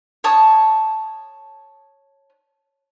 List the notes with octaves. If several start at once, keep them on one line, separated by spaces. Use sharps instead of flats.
C#5 A5 D#6